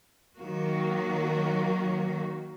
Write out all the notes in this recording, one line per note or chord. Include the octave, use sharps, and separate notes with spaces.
D#3 F#3 A#3 F#4